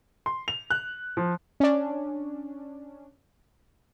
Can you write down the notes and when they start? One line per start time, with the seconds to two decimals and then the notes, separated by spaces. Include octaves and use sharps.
0.26 C6
0.48 F7
0.70 F#6
1.17 F3
1.60 C#4 D4